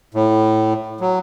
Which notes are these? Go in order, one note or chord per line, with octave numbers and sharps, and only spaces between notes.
A2
F#3